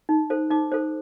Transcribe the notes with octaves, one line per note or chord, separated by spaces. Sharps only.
D#4
A4 C5
D#4 D6
A4 C5